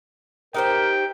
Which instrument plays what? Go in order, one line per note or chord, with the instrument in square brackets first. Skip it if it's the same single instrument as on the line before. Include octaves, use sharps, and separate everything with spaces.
[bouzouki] D#4 G4 C5 [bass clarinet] A#4 [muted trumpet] G5